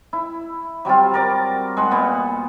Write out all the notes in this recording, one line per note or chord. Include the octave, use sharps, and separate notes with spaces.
E4
F#3 G3 C4 F4
A#4 D5 D6
G#3 F#5 C6
A#2 B3